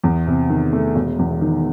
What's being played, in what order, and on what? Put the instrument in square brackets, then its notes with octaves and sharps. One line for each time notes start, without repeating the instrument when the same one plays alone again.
[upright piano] E2
C3
D#3
A3
E1
E2
D#3